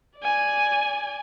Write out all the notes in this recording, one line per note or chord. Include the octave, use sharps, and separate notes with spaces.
D5 G#5